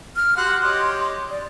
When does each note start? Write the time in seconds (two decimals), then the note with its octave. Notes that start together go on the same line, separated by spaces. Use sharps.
0.16 F6
0.37 F#4 G4 F#5 C6
0.63 G4 C#5 D#5
1.30 D5